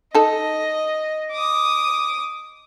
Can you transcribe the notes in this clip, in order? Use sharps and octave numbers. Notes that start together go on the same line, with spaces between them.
D#4 A4 D#5
D6 D#6